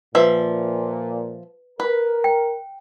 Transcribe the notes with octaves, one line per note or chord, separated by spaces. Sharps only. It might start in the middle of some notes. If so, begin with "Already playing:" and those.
A#2 F3 B4 E5
A#4 B4
G5